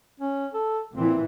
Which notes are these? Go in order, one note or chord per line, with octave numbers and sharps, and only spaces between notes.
C#4
A4
A#2 E3 C4